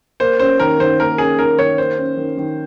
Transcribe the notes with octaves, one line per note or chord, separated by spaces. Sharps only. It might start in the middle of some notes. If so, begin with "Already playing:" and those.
A#3 C5
C#4 C5
D#3 A#4
D#3 C5
A#3 A#4
C#4 G#4
D#3 A#4
D#3 C#5
A#3 C5
C#4
D#3
D#3